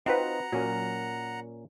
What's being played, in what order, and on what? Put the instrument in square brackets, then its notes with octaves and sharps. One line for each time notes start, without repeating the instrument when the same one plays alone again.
[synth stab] C4 F#4 B4 [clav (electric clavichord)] D#4 F4 [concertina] F#5 A#5
[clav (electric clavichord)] A#2 C#4 A#4 [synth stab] F#3